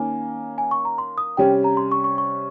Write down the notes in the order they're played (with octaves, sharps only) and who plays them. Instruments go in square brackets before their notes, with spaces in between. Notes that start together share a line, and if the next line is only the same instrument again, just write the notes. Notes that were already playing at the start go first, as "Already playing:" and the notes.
Already playing: [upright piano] D#3 A#3 C#4 [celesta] G#5
[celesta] G#5
C#6
A#5
C6
D#6
[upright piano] C3 G3 C#4 [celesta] G5
[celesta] A#5
C6
C#6
C#6
C#6